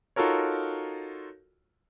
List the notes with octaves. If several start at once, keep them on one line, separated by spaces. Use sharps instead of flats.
D#4 F4 F#4 A4 A#4 C#5